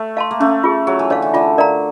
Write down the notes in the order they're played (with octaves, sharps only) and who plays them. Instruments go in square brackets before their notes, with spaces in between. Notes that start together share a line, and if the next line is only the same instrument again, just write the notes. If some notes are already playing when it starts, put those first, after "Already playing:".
Already playing: [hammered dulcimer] A3
[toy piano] F5 A5 C6
[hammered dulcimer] A#3
[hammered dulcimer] A3 [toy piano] C#4
[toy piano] F4 G#4
[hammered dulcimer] F#3 [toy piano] G#4
[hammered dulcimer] E3
[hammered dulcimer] D3 [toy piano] C#5 F5
[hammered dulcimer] E3
[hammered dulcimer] D3 [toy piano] F4
[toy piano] A#4 D5 F5 A#5